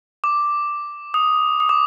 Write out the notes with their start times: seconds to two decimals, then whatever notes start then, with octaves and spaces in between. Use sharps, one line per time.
0.24 D6
1.14 D#6
1.60 D#6
1.69 D6